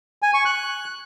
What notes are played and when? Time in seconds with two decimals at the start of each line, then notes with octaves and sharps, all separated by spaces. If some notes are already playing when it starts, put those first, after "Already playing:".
0.22 G#5
0.34 C#6
0.45 F#6